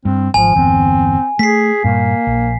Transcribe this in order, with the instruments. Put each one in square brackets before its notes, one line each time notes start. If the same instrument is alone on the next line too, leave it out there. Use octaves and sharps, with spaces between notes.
[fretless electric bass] G2 [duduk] C4
[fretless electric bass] G#1 [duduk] F3 [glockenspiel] G#5
[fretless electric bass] G1 E2 [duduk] C4
[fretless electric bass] A3 [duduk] G#4 [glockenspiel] B6 C7
[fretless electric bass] G2 A#2 [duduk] A#3
[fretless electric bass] A#1